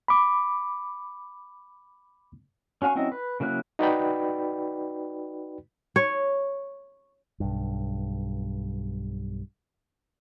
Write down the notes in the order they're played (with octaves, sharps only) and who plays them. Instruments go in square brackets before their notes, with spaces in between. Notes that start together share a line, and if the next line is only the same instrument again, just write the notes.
[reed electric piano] B5 D6
[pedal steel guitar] C#4 F#4 F5 G#5 C#6
F#3 C4 C#4 E4 D#5
B4
C#3 F#3 A#3 E4 F#6
[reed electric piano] D#4 F#4 B4 D5 G5 B5
[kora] C#5
[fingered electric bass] B1 G2